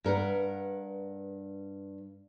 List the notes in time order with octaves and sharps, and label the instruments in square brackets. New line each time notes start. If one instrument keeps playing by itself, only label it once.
[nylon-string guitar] G2 A#4 B4 F#5